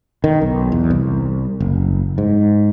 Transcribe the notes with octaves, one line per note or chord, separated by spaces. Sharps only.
D#3
B1
E2
C2
F#1
G#2